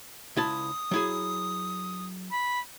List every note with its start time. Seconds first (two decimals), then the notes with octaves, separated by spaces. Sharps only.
0.37 C#2 E4 A5 D#6
0.91 F#3 E4 G#4
2.31 B5